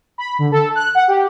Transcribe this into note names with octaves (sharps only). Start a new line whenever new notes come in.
B5
D3
A4
F#6
F#5
G4